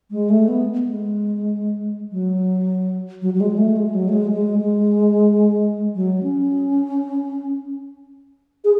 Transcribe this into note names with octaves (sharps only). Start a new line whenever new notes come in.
G#3
A3
B3
G#3
F#3
F#3
F#3
G#3
A3
G#3
F#3
A3
G#3
G#3
G#3
F#3
C#4
G#4